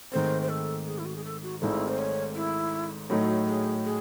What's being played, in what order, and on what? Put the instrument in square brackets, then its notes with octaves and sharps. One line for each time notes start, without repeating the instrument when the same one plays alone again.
[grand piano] G#2 D#3 A3 C4 [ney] C5
[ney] C5
A4
G#4
E4
F#4
G#4
A4
F#4
[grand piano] G#1 G#2 D#3 A3 C4 [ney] E4
[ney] C5
C#5
E4
[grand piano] A2 F#3 A3 D#4 [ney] F#4
[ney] G#4
G#4